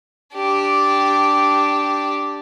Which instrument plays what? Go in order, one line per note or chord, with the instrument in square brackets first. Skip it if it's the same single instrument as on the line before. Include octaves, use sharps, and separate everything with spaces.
[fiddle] D4 G4